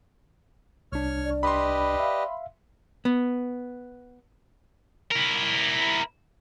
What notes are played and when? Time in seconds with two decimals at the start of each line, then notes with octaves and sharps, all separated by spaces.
0.92 C2 D4 C#5 F6
1.25 D5
1.43 G4 B4 D#5 B5 C6
2.00 E5 F5
3.05 B3
5.11 E4 A#4